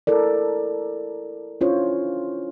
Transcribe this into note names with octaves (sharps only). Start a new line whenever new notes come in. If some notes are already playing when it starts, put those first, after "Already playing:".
E4 A4 A#4 D5
C#4 D4 E4 F4 C5 C#5